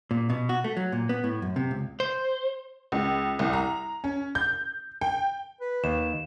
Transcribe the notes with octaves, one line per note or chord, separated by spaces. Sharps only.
A#2
B2
F#4
A3
F#3
A#2
B3
A2
F#2
C3
C#2
C5
C#2
C2
A#5
C#4
G6
G5
B4
D#2 E7